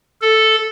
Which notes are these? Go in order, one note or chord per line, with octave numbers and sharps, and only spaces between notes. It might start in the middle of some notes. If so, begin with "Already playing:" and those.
A4